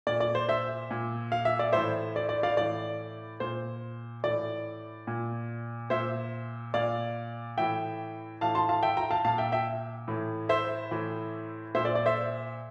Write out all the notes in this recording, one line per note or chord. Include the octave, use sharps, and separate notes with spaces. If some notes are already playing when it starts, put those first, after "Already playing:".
A#2 D5
D5
C5
C5 E5
A#2
F5
E5
D5
A2 E3 C5 E5
D5
D5
D5 F5
A2 E3 D5
A#2 C5
A2 E3 D5
A#2
A#2 C5 E5
A#2 D5 F5
A2 E3 E5 G5
A2 E3 F5 A5
A5 C6
F5 A5
E5 G5
G5 A#5
F5 A5
A#2 F5 A5
E5 G5
E5 G5
A2 E3
C5 E5
A2 E3
A#2 C5 E5
D5
D5
C5 E5